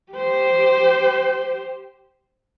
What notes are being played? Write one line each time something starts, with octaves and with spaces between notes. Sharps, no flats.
G4 C5